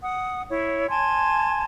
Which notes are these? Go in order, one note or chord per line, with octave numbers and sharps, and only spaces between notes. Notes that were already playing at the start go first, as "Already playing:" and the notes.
F#5 D#6
E4 C#5
G#5 A5 C6 G#6